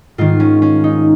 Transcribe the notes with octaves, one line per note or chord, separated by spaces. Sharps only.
G#2 D#3 F4
C#4
C#4
D#4